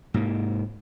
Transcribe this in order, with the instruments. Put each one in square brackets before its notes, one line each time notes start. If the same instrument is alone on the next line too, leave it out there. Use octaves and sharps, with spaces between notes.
[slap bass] G#2 C3 A#3